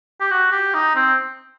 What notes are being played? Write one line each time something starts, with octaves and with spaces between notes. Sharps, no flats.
G4
F#4
G4
D#4
C4